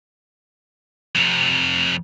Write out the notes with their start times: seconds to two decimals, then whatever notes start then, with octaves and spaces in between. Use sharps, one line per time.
1.15 F2 C3